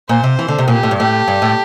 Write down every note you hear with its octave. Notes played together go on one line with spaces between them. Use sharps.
A#2 C5
C3
E3
D3
C3
A#2 G4
A2
G2
A2 G4
G2
A2